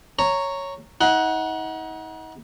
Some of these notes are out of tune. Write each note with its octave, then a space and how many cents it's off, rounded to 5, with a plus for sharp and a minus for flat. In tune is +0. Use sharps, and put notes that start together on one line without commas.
C#5 +0 A#5 -10
D#4 +40 F#5 +0